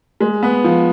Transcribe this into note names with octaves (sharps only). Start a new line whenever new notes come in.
G#3
B3
F3